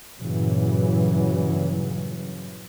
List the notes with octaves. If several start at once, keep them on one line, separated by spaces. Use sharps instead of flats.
G2 A#2 C#3 E3 F#3